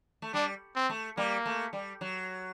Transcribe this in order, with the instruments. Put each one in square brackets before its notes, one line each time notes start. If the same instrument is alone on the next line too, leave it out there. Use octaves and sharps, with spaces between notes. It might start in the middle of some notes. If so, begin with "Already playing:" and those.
[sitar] A3
[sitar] G3 [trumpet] D4
[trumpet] C4
[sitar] A3
[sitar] G3 [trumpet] A#3
[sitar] A3
G3
F#3